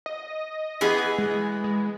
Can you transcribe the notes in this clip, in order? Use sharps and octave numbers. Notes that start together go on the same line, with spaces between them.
D#5
E3 B3 G#4
G#3
G#3